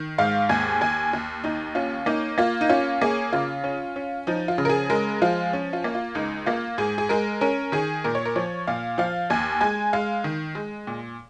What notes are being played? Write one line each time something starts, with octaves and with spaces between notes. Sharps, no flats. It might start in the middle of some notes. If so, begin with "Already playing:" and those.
Already playing: D#3
G#2 F5
D#2 G#5
D#2 G#5
D#2
D#2 D#4
C#4 F4
A#3 D#4
A#3 F4
D#4
C#4 F4
A#3 G#4
C#3 F4
C#4
C#4
F3 D#4
F4
C#3
A#4
G#4
G#3 A#4
F3 F4
C#4
F4
A#3
F4
C#2 D#4
A#3 F4
G#2 G#4
G#4
G#3 A#4
C#4 A#4
D#3 G#4
A#2 A#4
C#5
A#4
F3 C#5
A#2 F5
F3 F5
D#2 G#5
G#3 G#5
G#3 F5
D#3
G#3
A#2